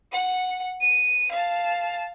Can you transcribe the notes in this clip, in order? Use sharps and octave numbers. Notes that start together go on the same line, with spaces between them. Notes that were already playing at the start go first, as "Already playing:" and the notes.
F#5
D#7
F5 A5